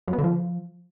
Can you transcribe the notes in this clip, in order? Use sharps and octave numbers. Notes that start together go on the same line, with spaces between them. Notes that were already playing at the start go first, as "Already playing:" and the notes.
F#2
B3
D3
F3